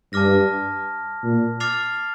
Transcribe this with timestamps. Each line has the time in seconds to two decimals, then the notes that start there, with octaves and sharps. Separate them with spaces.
0.13 G2 A5 D6 F6 A#6
1.23 A#2
1.60 D6 F6 A6 C7 F7